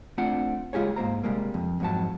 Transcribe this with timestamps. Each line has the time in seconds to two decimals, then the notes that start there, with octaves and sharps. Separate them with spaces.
0.18 A3 C4 D4 F4 F#5
0.73 G#3 F4 G4 G#4 C#5
0.96 G#2 A#3 C5 A#5
1.23 C3 G3 G#3 A#3
1.54 F2
1.80 F2 G#2 F#3 A5